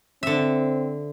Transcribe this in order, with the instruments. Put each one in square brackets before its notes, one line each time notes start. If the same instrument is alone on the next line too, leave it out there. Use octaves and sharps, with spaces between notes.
[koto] D3 E5 [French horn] C4